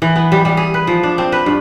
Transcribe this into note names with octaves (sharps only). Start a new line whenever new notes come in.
E3
B3
G3
G3
G#4
B4
F3
D4
C4
B4
G2